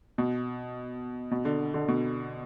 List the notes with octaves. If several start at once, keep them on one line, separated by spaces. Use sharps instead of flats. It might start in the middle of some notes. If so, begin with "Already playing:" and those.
B2
B2
D3
D3
B2